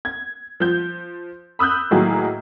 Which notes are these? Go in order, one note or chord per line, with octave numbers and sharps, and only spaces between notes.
G#6
F3 G6
B5 D#6 E6 F#6 G6
A2 D#3 F#3 A#3 G#4